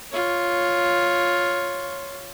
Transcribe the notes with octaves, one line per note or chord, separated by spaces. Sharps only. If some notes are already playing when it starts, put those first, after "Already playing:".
F4 C#5